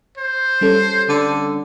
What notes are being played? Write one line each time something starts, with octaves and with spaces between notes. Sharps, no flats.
C5
G3 C#4 A4
D3